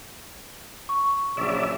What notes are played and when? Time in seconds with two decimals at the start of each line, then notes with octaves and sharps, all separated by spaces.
0.89 C#6
1.37 A#1 C#3 F#3 D5 E5